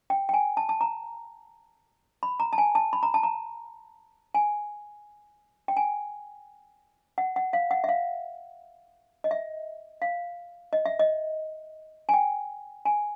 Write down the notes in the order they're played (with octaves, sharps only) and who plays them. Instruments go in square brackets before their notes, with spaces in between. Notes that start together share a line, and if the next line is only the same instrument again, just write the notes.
[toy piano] G5
G5
G#5
A5
A5
A#5
B5
A#5
A5
G#5
A5
B5
A#5
A5
A#5
G#5
G5
G#5
F#5
F#5
F5
F#5
E5
F5
D#5
E5
F5
D#5
E5
D#5
G#5
G5
G#5